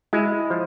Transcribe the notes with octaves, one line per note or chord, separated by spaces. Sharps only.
G#3 E4
F3